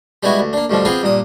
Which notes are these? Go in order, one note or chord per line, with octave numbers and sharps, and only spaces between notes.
G3 G#3 B3 E4 F#4
D2
A#3 D4
D2 G2 B2 F3
B3 C4 F4 G4 G#4
G2 A#2 D#6